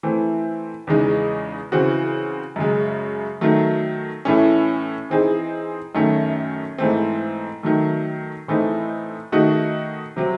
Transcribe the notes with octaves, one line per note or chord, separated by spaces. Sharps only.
E3 A3 C4
E2 C#3 G#3 D#4
C#3 E3 C4 F#4
F#2 C#3 G#3
D#3 F#3 A3
A2 E3 A3 C#4
E3 C4 D#4 G#4
F#2 D#3 A3 C#4
G#2 E3 A3 C4
D#3 F#3 A3
A2 E3 A3 C4 D#4
D#3 A3 D#4 F#4
C3 F#3 C4